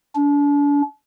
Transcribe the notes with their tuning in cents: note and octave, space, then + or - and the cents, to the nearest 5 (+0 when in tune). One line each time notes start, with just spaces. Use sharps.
D4 -35